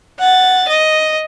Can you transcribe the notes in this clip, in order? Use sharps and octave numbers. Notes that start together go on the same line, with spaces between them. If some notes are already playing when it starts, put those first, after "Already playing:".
F#5 A6
D#5